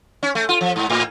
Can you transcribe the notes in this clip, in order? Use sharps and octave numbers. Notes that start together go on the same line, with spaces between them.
C#4
A3
F4
F3
G#2
A2